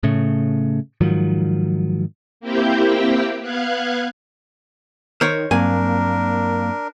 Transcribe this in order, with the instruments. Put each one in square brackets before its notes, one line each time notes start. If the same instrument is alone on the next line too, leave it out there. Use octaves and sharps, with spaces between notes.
[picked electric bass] A2 C#3 A3
G#2 D#3 F3 F#3
[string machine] A#3 C4 E4 G4 G5
B3 F5 F#6 G#6
[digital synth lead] D#3 [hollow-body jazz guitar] A#4 C5 C#5
[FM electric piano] G2 F#3 C4 [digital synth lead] A#3 [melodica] D4 A#4 [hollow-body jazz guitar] G#5